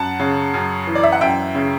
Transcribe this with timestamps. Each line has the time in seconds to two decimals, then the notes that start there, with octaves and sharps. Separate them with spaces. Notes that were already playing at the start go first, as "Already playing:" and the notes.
Already playing: F#2 F#5 A5
0.20 C#3
0.54 F#2
0.87 E3
0.95 D5
1.03 E5
1.12 F#5
1.21 F#2 E5 G5
1.55 C#3